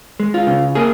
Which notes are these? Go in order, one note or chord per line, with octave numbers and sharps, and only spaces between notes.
G#3
F4
C#3
A#3 G#4